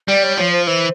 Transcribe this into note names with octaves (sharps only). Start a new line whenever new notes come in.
G3 D5
C#5
F3 C#5
C5
E3 C5